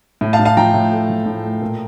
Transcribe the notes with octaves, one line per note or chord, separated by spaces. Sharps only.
A2
F5 A5
A2
F5 A5
F3 G5 A#5
A2
A3
F3
A2
A3
A#2